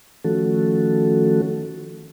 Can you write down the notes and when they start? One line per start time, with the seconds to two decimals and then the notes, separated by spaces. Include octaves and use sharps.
0.24 D#3 F3 A3 C#4 F#4 A4